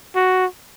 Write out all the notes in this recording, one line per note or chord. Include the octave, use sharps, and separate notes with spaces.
F#4